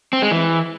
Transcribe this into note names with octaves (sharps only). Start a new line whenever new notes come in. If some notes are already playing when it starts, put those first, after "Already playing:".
C4
G#3
E3